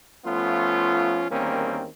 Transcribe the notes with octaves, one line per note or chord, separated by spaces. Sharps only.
F3 A3 B3 C#4 F4
E2 D#3 G3 A#3 C4 C#4